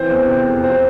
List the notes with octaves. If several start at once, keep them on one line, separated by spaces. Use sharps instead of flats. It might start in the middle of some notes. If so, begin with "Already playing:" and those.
Already playing: E3 C4 C5
E2
C3
F1
F3 C4 C5